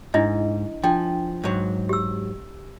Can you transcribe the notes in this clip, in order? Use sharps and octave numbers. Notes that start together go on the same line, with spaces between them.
G#2 D4 E4 D#5
F3 D4 G5
G#2 F#3
G4 E6